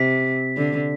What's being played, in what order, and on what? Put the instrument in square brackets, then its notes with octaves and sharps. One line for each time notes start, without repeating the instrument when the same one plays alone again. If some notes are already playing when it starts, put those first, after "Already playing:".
Already playing: [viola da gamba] C3 [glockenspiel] B6
[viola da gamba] D3